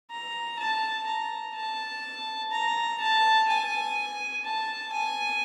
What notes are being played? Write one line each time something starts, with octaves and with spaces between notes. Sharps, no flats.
A#5
A5
A#5
A5
A#5
A5
G#5
A5
G#5